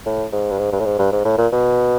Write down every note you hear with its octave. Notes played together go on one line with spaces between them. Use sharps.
A2
G#2
G2
G#2
G2
A2
G#2
G2
G#2
A2
A#2
B2